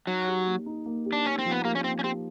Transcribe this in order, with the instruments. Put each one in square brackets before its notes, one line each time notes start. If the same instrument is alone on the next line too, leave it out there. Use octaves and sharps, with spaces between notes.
[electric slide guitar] F#3 [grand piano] D#4
[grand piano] G4
A#3
D#4
A#3
G4
[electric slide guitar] D4
[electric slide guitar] C#4 [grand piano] D#4
[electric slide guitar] C4
[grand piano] F3
[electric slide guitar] B3
[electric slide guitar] A#3 [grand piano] G4
[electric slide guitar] C#4
[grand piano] A#3 [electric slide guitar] C4
[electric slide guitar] C#4
[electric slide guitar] C4 [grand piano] G4